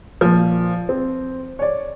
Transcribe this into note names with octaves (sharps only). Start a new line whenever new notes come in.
A#2 F3
C4
C#5 D5